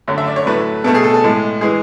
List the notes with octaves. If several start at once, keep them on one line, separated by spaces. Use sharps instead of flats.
F#2 D3 A3 C#5
E5
D5
C#5
A2 F#3 A3 B4
B2 A3 A4
G#4
A4
A4
A2 G#3
E3 G#3 G#4